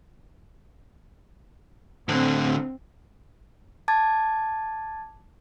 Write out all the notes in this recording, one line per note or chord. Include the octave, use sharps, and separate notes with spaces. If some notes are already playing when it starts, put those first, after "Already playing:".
A2 D3 C4
A5 D6 G#6 A6